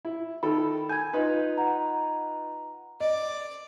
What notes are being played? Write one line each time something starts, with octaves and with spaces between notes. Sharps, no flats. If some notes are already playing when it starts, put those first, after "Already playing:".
E4
D#3 A4 B5
G#5 G6 G#6
D#4 F4 B4
F#5 A#5
D5 D#5